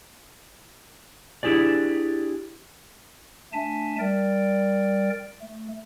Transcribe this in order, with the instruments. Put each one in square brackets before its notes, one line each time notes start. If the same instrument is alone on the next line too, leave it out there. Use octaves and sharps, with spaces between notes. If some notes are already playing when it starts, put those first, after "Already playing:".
[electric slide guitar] D4 E4 G4 G#4 D5
[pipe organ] A3 D4 E5 G#5 A5
G3 A#4 D5 G5
A3